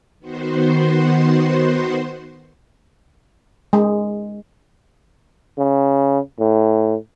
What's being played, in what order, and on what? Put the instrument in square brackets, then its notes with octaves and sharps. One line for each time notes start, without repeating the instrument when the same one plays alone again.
[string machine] D#3 B3 F#4 C5 C6
[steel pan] G#3
[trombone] C#3
A2